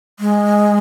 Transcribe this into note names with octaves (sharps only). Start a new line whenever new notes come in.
G#3